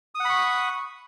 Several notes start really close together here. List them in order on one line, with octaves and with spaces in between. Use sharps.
D#6 F#5 B5 C#6